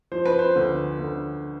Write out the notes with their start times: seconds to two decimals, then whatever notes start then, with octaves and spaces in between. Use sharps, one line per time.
0.12 F3 C5
0.26 B4
0.39 C5
0.56 D2
0.99 D2